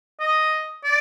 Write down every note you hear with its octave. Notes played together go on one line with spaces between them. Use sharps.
D#5
D5